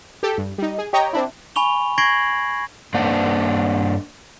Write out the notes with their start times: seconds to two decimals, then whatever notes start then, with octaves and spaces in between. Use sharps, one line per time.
0.23 G4 A4
0.38 G2
0.58 G3 D#4
0.78 G#4
0.93 G4 C#5 D#5 G5 A#5
1.13 C4 D4 E4
1.56 G#5 B5 C#6 F7 G7
1.98 C#6 G#6 A#6 C7 D7 F#7
2.94 G2 A#3 D4 C5 F#5